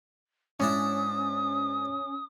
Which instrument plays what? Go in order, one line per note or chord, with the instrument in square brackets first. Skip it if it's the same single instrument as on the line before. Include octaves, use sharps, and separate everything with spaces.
[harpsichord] G#2 D4 E4 [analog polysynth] C#4 [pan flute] D#6